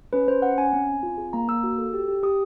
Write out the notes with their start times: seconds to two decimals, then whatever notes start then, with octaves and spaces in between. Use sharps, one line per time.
0.13 C#4 B4
0.27 C#4 C5
0.42 C#4 F#5
0.58 C#4 G#5
0.73 C4
0.88 C4
1.03 F4
1.18 G#4
1.33 A#3 A#5
1.48 A#3 E6
1.63 F#4
1.78 A4
1.93 G4
2.08 G4
2.23 G4 D#6